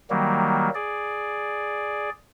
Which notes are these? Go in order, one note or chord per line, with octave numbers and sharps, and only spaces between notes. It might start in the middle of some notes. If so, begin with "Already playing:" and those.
D#3 F#3 G3 A#3
G#4 D5